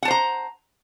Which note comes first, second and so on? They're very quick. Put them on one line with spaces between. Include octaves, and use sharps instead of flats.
F#5 A5 C5 A#5